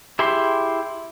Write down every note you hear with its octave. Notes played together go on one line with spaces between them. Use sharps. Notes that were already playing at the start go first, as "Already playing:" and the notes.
E4 G4 G#4 E5 C6